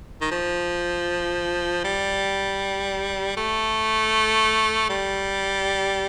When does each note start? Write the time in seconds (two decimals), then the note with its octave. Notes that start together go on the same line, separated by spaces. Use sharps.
0.21 D#3
0.31 F3
1.84 G3
3.37 A3
4.89 G3